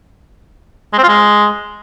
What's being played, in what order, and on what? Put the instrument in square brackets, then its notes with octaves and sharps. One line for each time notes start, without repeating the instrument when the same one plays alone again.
[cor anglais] G#3
C4
F4
G#3